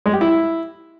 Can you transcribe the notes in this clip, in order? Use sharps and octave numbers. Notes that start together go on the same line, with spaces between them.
G#3
G4
E4